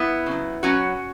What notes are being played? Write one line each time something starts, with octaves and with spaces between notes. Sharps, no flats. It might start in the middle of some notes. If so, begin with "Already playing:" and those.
Already playing: B3 E4
C#3 F#3
B2 F#3 C#4 F#4